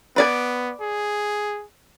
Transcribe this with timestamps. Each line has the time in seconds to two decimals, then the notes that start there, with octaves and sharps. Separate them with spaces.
0.16 B3 B4 D5 G#5
0.81 G#4